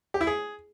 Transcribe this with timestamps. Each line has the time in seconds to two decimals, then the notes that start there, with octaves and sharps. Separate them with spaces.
0.14 G4
0.21 E4
0.27 G#4